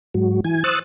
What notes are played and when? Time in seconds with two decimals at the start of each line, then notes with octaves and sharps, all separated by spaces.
0.14 G#2 F#3
0.44 E3 G#5
0.64 C5 C#6 D#6 E6 F#6 A6